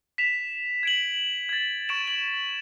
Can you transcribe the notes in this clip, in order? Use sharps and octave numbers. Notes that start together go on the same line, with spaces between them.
B6 E7 F7
G#6 D7 F#7
G#6 A6
C#6 A6 D7 E7
F#7